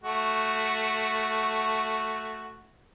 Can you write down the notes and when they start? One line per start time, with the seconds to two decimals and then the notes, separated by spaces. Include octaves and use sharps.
0.04 A3 F#4